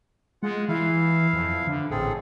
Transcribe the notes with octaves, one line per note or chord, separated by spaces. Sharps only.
G#3 F4 F#5
E3 E4 F5
F2
D3
A1 C4 G#4 A4